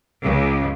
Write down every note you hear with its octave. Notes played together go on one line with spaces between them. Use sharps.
C#2